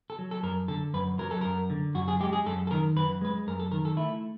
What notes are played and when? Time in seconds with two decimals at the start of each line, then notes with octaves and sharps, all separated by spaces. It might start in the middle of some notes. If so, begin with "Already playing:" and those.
0.10 A4
0.19 F#3
0.31 A4
0.43 F#2 A#4
0.68 D3 A4
0.94 F#2 B4
1.19 F#3 A#4
1.31 A4
1.41 F#2 A#4
1.70 D3
1.95 F#2 F#4
2.08 G#4
2.21 G#3 G4
2.33 G#4
2.46 F#2 A4
2.67 A4
2.71 D#3 A#4
2.96 F#2 B4
3.21 G#3 B4
3.47 F#2 A#4
3.60 A4
3.72 D#3 A#4
3.85 A4
3.97 A3 E4